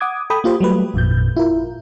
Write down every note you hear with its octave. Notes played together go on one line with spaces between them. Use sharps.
F#5 D6 D#6 G#6
A4 G5 B5 D#6
A#3 F4 G4 C5
F#3 G3 A3 B4
G#1 F2 A#2 G6
E4 F4 A#4